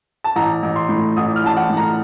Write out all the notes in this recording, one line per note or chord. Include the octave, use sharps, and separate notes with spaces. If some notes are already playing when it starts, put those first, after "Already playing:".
A5
A1 A#5
A1
C6
A2
A1 D#6
F6
A1 A5
F#5
A2
A#5